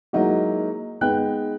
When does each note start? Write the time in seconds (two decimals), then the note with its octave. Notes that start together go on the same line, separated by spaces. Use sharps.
0.13 F#3 G#3 A#3 D#4 E4 F#4
1.01 G#3 B3 D#4 G5 F#6